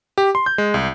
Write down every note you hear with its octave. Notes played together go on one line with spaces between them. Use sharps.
G4
C6
G6
G#3
C2